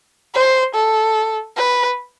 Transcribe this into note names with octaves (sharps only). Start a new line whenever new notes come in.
C5
A4
B4